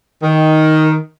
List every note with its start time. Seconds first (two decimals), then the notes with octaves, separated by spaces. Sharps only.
0.23 D#3